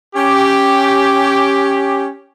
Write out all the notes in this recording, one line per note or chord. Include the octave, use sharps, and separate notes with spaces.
C#4 G4